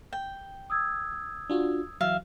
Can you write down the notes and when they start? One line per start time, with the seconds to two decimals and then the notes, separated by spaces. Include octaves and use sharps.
0.13 G5
0.70 D#6 E6 G#6
1.50 D4 F4 F#4
2.01 E3 F#3 E5 F5